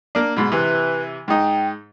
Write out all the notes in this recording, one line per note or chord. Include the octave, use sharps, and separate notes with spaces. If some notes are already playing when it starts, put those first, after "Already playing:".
A#3 D4
G#2 B2
C3 E3 B4
G#2 D#4 G5